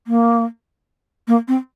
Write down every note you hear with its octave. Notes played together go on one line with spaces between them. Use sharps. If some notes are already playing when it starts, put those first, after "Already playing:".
A#3
A#3
C4